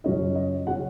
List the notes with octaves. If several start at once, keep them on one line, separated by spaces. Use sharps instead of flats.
F#2 C#3 F#3 C#4 F4 D#5
D#5
C#3 F#3 C#4 F4 F#5